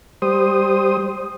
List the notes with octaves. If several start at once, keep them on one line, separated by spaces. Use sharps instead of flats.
G3 C5 D#6